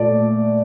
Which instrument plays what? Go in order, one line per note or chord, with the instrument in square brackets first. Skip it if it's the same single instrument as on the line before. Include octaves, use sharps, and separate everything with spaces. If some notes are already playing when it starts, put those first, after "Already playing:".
Already playing: [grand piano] A#2 A3 D5